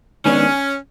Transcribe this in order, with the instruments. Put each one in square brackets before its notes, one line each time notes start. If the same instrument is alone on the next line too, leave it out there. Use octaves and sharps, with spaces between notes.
[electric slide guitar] D#3 G#3 B3 D4 [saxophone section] C#4